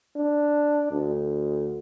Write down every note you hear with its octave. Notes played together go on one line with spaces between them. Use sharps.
D4
D2